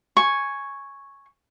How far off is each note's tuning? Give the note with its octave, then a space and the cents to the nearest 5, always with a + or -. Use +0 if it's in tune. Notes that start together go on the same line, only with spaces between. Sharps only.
G#5 +0 C#6 +0